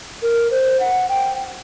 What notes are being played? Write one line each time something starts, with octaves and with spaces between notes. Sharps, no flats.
A#4
C5
F#5
G5